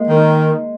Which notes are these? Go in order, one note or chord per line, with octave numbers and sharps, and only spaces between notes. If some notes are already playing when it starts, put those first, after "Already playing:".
Already playing: G#3 A#3
D#3